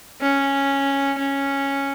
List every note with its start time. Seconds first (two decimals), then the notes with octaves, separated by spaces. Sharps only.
0.21 C#4
1.18 C#4